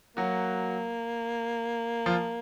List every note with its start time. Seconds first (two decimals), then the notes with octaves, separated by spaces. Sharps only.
0.17 F#3 A#3 F#4
2.06 F3 F4